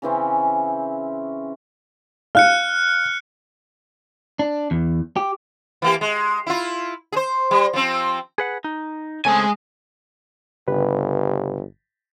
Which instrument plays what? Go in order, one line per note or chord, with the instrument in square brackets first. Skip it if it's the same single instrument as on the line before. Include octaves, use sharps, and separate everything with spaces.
[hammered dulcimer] C#3 E3 C4 C#4
[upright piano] F5 [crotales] F6 F#6 C#7
[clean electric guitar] D4
E2
G4
[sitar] E3 A#3 G4
G#3
E4 F4
G#4 C5
G3
F3 C4
[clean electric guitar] G#4 B4 F#5
D#4
[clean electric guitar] C#3 A3 C4 [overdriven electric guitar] G#3 G#5
[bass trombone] G1 [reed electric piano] C#3 G4 B4